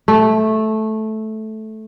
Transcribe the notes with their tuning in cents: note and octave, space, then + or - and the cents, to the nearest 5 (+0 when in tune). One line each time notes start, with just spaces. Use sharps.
A3 -10